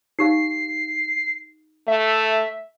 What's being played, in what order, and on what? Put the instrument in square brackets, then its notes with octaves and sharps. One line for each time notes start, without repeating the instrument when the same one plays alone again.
[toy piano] D#4 G4 F5 [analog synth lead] C7
[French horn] A3 [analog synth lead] E5